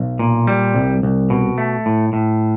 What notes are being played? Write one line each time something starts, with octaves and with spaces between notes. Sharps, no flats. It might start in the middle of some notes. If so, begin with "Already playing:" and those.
Already playing: B1
A#2
G3
C2
C2
B2
A3
A2
A2